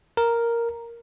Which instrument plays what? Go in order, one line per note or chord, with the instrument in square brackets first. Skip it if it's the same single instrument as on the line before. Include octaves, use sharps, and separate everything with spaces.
[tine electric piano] A#4